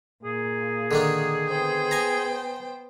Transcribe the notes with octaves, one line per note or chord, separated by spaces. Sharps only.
A#2 G#4
D3 D#3 D4
B3 C5 G5
G#5 A#5